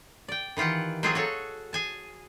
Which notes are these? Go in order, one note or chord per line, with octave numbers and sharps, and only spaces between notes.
D5 G5
D#3 E3 F4 G4 F#5
F#3 A#3 C4 F4 F#4 G#4
F#4 G#4 A4 C#5
G#4 G#5 A5